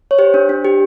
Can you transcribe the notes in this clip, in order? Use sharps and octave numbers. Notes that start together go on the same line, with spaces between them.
C#5
G4 C5
D4
D4
G4